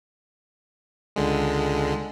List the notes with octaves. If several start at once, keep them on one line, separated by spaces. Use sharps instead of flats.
C#2 D3 G#3